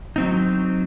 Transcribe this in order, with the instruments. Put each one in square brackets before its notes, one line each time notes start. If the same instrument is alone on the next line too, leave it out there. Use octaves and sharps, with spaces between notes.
[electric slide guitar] F#3 C4 D#4